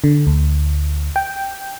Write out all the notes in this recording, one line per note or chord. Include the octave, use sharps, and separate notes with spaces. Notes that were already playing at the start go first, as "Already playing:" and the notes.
D3
D2
G5